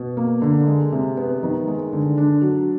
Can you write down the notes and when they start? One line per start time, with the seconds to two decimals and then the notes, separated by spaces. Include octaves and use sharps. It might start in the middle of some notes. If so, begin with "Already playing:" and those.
Already playing: B2
0.17 A#3
0.42 D3
0.67 G#3
0.92 C3
1.17 B3
1.43 D#3
1.68 G#3
1.93 D3
2.18 D4
2.42 F#3